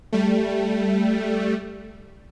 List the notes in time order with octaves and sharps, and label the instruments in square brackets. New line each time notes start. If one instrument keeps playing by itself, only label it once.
[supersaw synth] G3 A3